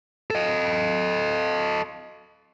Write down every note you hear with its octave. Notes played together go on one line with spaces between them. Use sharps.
A4 D#5